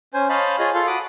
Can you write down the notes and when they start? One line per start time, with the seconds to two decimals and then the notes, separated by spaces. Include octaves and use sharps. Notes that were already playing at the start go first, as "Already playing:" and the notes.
0.14 C#4 C5 G#5
0.29 C5 C#5 D#5 F5 A5 B5
0.59 F4 G#4 C#5 D#5
0.75 F4 A4 F5 C6
0.87 F#4 B5 D6 D#6